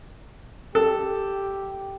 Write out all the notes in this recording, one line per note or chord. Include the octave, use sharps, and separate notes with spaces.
G4 A4